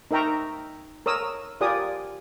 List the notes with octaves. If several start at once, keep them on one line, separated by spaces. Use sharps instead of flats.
D#4 A#4 E5 G5 A#5 C#6
A#4 C#5 D#6 E6
F4 G4 A#4 D5 G#5 D#6